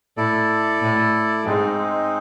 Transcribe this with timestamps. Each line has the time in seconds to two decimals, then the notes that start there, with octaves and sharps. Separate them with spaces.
0.17 A2 E4 A4 D5
0.82 A2
1.45 G#2 G#3 C4 D#4